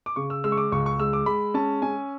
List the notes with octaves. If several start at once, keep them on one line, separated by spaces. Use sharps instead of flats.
D6
C#3 C#6
E6
G#3 E6
C#6
D6
C#2 C#6
C#6
G#3 E6
D6
G#3 B5
C#4 A5
C#4 G#5